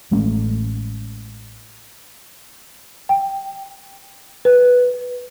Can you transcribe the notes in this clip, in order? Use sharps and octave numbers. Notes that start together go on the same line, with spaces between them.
A1 G#3 A3 C#4
G5
B4